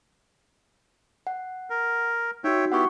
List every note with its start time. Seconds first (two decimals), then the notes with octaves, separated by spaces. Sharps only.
1.27 F#5
1.70 A#4
2.44 D#4 F#4 C#5 E5 G5
2.72 B3 E4 G4 F#5 C#6